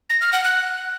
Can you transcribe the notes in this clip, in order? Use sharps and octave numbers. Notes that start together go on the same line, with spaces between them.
A#6
F6
F#5
F#6